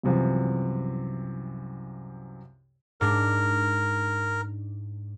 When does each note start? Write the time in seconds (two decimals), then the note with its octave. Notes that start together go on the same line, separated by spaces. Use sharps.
0.03 C2 F#2 C3 E3 F3
3.01 G#2 D4 A#4